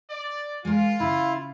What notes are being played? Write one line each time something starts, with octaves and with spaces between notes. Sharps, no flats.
D5
G#3 F4 A#4
C#3 E4